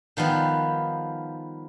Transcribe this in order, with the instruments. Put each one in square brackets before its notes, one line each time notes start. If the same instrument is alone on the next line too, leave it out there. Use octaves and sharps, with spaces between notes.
[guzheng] D#3 F3 G3 B3